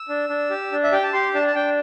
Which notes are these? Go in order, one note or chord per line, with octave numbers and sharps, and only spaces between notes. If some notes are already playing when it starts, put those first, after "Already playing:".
Already playing: E6
D4
D4
G4
D4
E5
G4 G5
A5
G4 C6
D4 A5
A5
D4 G5